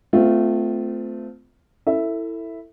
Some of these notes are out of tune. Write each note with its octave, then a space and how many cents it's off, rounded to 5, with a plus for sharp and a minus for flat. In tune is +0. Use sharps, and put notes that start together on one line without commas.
A3 +0 C4 -35 F4 +0
E4 +0 A4 +25 E5 +0